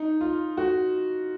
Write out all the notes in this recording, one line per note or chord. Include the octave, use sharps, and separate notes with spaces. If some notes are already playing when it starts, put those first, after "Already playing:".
Already playing: D#4
F4
F#4